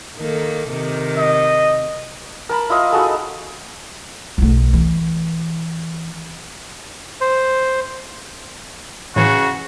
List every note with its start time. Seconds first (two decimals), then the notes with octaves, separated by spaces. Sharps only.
0.17 D#3 A#3 A4
0.70 C3 D#3
1.18 D#5
2.49 A#4 A5 B5
2.70 E4 F4 D#5 F5
2.92 D#4 F#4 G#4 A4
4.38 B1 A3
4.73 E3
7.21 C5
9.16 A2 C#3 E3 F#4 C7